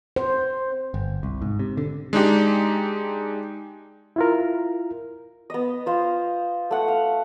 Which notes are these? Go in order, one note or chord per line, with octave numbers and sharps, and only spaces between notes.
C5
G1
C2
G#2
C3
D3
G#3 D4 D#4 G4
E4 F4 A#4
B3 D#5
F4 C5 F5
A3 F#5
F5